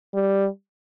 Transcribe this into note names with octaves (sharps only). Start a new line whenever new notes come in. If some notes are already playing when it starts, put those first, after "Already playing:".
G3